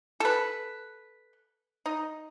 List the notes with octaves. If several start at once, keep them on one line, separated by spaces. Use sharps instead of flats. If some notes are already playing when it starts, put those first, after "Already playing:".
A4 B4
D#4